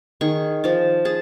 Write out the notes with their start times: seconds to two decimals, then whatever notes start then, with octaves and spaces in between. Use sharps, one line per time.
0.21 D#3 G#4 C#6
0.64 F3 A5
1.05 G#4 A5